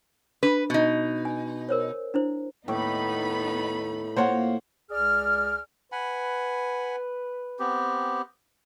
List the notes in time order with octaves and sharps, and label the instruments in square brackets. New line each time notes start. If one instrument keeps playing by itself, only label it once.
[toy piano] D4 B5 [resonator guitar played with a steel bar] B4
[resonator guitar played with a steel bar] B2 D#4
[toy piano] G#5
A#4 C5 C#5
D4 E4 C5
[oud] D#2 [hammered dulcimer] A2 D6 [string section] B3 D#4 B5
[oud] A#3 C4 F4 [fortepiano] C5 C#5 F#5
[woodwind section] C#2 G#4 D5 F6
[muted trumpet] B4 [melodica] F#5 G#5 B5
[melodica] B3 C4 G4